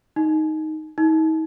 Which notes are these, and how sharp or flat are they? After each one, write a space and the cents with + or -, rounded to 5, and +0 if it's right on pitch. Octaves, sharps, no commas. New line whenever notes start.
D#4 +5
D#4 +40